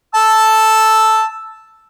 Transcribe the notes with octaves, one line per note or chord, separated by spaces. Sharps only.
A5 E6